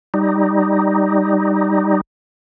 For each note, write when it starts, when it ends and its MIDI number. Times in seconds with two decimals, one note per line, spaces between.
0.14 2.01 55
0.14 2.01 63